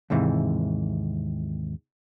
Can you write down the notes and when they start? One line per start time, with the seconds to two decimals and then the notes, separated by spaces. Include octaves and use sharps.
0.10 D#2 G#2 C3 E3